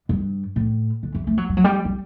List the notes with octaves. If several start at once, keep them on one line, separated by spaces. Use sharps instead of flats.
G2
A2
D3
E3
A3
F#3
G3
F#3
G3
G3